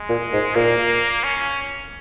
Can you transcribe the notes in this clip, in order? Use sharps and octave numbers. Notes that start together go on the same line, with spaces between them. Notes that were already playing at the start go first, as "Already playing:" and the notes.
Already playing: G#3
A#2
G#2
A#2 A#3
C#4